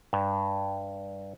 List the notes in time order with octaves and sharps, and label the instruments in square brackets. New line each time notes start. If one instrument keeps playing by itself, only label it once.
[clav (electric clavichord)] G2